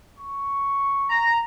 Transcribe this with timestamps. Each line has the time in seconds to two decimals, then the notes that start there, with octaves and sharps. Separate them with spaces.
0.19 C#6
1.09 A#5